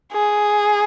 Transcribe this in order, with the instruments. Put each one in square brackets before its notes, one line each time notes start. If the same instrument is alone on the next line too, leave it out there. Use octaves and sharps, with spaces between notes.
[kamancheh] G#4